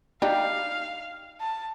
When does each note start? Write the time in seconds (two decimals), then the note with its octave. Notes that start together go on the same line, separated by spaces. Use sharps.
0.22 D4 D#4 G4 F5
1.40 A5